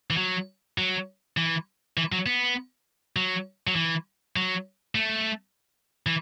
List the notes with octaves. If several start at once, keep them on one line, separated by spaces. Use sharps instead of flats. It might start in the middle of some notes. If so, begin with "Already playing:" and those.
E3
F#3
F#3
E3
E3
F#3
B3
F#3
F#3
E3
F#3
A3
E3